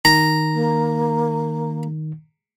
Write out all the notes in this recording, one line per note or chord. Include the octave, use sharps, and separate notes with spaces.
D#3 A#5
A#3